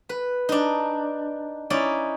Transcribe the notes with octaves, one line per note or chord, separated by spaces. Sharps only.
B4
D4 D#4
C#4 D#4 E4 D5